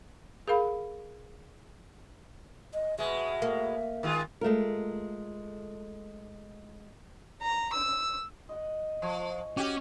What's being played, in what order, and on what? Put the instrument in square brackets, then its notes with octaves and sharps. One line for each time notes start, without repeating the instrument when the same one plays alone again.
[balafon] G#4 A#4 F5 B5
[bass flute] D#5
[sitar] B2 G#3 [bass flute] E5
[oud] A#3
[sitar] D#3 G#3 F4
[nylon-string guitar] G#3 A3 F4 A#4
[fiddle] A#5
E6
[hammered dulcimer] D#5 F#5
[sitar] F3 [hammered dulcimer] G#5 C#6
[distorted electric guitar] C#4 [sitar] F#4 G4